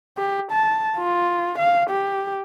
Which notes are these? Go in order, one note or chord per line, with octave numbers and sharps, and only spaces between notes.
G4
A5
F4
F5
G4